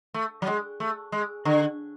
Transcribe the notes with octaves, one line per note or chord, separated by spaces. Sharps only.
A3
F#3
G#3
A3
G#3
D3